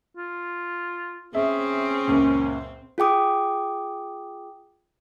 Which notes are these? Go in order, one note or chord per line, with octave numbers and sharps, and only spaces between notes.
F4
C4 C#4 G#4 E5
C#2 F#2 A#2
F4 G#4 G5 D6 D#6